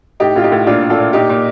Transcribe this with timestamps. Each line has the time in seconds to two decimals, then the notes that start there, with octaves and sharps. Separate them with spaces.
0.20 A2 D#4 G4
0.36 A2 F4
0.44 D#4 G4
0.52 A2
0.67 A#2 D4 F4
0.82 A#2
0.90 F4 A4
0.98 A#2
1.13 A#2 D#4 G4
1.29 A#2